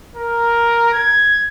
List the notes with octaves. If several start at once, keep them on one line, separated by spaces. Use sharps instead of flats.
A#4
G#6